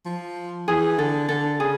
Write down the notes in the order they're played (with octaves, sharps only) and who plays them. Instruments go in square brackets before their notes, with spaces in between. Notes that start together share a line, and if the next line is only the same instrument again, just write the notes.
[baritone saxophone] F3
[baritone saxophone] E3 [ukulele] G#4
[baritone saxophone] D3 [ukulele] A4
[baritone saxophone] D3 [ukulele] A4
[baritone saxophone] C#3 [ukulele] G#4